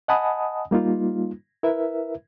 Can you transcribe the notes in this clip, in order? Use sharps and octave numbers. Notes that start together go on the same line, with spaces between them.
D#5 F#5 G#5 A5 B5 D#6
G3 A#3 D#4 F4
E4 A#4 B4 E5